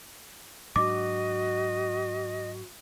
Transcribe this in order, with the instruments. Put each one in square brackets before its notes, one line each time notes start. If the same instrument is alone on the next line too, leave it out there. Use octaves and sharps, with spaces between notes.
[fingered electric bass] G#2 F#3 D4 [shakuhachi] F#4 [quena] D#5 [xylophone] D6